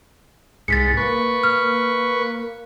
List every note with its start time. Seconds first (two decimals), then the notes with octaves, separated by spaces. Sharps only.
0.68 C2 G#2 A6 B6 C#7
0.97 A#3 B4 C#6
1.43 F6